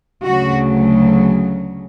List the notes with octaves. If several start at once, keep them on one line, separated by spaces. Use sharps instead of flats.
D2 C#3 F#3 A3 F#4